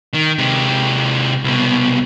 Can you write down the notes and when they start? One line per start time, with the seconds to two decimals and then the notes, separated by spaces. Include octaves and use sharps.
0.14 D#3
0.38 C3 G#3
1.44 C2 B2